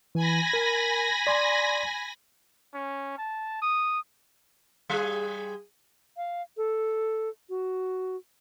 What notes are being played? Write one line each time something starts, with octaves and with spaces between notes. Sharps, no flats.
E3 G#5 B5 A#6
A#4
D5 C6 G#6
C#4
A5
D#6
G3 G#4
F5
A4
F#4